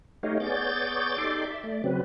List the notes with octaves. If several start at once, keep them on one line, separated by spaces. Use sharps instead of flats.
A3 D#4 G4 C#5 D#5 F5
B3 G#4 C#5 D5 G6 A6
D#4 G4 A4 D5 C6 D6
E5
A3 D5
C#3 F#3 C4 B4